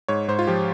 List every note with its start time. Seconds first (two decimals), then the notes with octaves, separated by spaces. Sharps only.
0.08 G#2 C#5
0.28 G#2 C5
0.39 F4
0.47 F3 G4